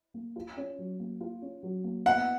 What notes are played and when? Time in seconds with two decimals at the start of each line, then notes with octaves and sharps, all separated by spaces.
0.14 A#3
0.36 F4
0.57 C#4
0.78 F#3
1.00 A#3
1.21 F4
1.42 C#4
1.63 F#3
1.84 A#3
2.06 B3 F#5